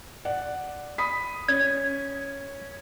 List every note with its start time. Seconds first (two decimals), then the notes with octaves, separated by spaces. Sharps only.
0.25 D5 F#5
0.98 B5 D#6 B6
1.49 C#4 G#6